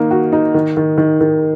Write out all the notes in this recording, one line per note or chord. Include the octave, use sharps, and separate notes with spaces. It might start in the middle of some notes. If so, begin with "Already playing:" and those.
Already playing: D#3 A#3 D#4
F#4
D#4
D#3
D#3
D#3
D#3